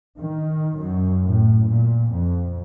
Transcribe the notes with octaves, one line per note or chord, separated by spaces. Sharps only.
D#3
F#2
A2
A#2
F2